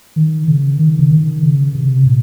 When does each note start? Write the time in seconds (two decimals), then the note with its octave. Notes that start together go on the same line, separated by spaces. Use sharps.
0.16 D#3
0.48 C#3
0.79 D#3
0.99 C#3
1.11 D#3
1.43 C#3
1.74 C3
2.06 A#2